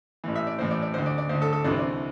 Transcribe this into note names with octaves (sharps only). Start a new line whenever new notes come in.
A1 A2 E3
E5
D5
A1 A2 E3 C5
D5
D5
D2 D3 C5
D5
D5
D2 D3 C5
A4
A4
C2 C3 E3 D4
C4
D4